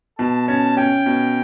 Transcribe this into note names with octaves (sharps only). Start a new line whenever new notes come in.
B2 A5
C#4 A5
C#4 G5
B2